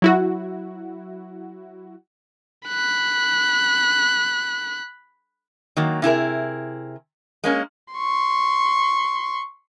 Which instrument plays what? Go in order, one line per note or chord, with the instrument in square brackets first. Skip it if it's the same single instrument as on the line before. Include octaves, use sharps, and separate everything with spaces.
[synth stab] F#3 E4 F#4
[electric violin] B5 F#6
[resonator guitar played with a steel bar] D#3 F#3 A#3
C3 E4 G#4 A#4
G#3 A#3 C#4
[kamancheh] C6 C#6